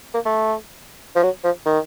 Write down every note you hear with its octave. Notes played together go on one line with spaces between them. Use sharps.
A#3
A3
F3
F#3
F3
D#3